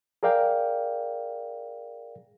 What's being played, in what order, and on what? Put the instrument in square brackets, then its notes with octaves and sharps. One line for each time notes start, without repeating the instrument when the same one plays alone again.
[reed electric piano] G#4 A#4 D5 F5 G5